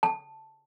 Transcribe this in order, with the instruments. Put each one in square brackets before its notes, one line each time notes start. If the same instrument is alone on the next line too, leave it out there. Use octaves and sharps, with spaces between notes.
[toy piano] A5